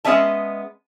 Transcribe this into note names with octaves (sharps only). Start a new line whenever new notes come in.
G#3 B3 C#4 D#5 E5 A5